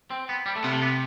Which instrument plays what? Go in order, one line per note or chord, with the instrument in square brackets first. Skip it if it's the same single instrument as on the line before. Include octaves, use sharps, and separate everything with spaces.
[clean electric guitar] C4
B3
G3
A3
[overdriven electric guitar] C3 [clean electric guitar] B3
[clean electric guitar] A3
B3